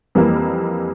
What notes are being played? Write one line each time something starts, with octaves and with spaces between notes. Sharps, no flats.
F2 E3 G3 A#3